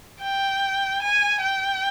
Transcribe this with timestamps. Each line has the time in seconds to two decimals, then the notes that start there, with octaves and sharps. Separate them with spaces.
0.22 G5
1.02 G#5
1.42 G5